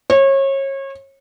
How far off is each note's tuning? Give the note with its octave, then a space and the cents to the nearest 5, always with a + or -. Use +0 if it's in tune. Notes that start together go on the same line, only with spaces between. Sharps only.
C#5 -30